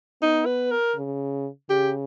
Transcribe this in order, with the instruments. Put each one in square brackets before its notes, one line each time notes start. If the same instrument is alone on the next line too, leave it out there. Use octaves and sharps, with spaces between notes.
[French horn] B3 [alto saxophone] D#4
[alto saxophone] B4
A#4
[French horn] C#3
[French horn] C#3 [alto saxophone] G4